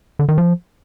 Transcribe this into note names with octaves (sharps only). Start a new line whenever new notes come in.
D3
D#3
F3